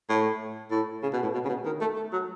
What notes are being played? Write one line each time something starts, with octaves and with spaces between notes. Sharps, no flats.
A2
A2
C#3
B2
A2
B2
C#3
B2
D#3
A3
A3
F#3